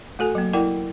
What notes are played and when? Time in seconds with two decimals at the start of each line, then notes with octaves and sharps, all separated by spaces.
0.19 A3 F#4 A4 G#5
0.35 F#3 A#3
0.53 E4 A#4 D5 F#5 G5